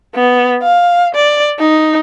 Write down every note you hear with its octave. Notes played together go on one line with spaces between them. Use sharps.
B3
F5
D5
D#4